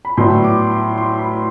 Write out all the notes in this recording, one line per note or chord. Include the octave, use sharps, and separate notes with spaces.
B5
A2 F#3 B3 D4 C6
D6
C6
C6
B5